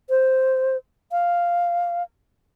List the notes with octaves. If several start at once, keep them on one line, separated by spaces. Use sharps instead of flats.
C5
F5